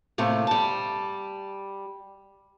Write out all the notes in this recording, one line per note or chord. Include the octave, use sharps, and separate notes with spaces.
A2 C3 A3 A#3
G3 A5